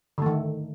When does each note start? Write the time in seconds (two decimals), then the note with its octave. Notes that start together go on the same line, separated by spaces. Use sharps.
0.18 D3
0.22 A3
0.26 D#3